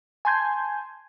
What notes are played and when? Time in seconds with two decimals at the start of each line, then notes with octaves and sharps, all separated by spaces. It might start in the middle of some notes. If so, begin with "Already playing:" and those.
0.25 G#5 A5 C6 G6 G#6